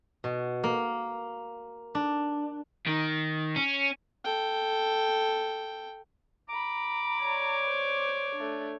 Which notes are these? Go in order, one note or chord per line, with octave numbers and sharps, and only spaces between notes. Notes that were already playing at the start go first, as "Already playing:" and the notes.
B2
A#3
D4
D#3
C#4
A4 G5
A#5 B5 D6
C#5 D5
C5
A3 D4